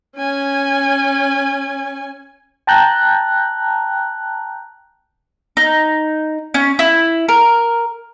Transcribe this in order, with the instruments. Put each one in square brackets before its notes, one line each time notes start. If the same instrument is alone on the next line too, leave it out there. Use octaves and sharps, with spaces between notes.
[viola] C#4 G#5
[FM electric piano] G5 A5 A#5 F#6 G6
[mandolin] D#4
C#4
E4
A#4